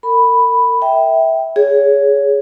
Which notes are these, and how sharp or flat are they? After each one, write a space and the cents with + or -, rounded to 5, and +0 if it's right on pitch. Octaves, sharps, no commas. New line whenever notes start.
A#4 -40 B5 +0
E5 -15 G5 +0
G#4 +0 C#5 +20